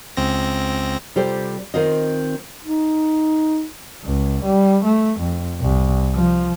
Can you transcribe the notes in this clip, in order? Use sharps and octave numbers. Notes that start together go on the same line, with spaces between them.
C#2 C4 A#6
C3 G3 F4 G4 A4 C5
D#3 C4 F4 D#5
D#4
C#2
G3
A3
F2
C2
F3